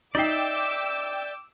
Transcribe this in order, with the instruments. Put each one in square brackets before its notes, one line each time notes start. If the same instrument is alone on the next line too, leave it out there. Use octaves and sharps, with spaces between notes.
[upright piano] D#4 C7 [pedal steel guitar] D5 E5 [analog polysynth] G5 G6 [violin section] D6 E6